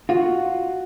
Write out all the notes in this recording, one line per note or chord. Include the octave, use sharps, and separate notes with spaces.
F4 F#4